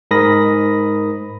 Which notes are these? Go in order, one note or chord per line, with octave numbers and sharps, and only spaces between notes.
G#2 A#4 B5 D#6 A#6